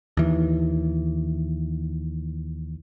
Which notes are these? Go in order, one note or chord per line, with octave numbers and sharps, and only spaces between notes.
D#2 E3